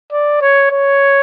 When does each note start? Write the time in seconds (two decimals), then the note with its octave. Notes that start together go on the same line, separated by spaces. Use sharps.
0.12 D5
0.42 C#5
0.72 C#5